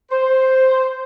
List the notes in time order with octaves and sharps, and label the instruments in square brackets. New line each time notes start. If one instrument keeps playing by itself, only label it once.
[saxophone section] C5